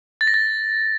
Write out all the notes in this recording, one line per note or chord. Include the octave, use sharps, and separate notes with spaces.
A6
A#6
A6